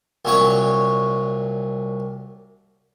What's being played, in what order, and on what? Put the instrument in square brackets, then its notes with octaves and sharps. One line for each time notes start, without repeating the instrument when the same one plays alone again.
[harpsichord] C2 A#2 F#3 C#5 C#6